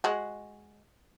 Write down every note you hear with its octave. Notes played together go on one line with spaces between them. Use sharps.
G#3 F#4